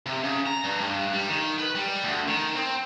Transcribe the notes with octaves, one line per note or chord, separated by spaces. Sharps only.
C3
C#3
A#5
G2
G2
G3
D#3
B4
G3
D2
D#3
C4